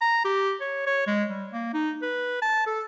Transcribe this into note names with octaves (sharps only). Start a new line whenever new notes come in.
A#5
G4
C#5
C#5
G#3
G3
A#3
D#4
B4
A5
A4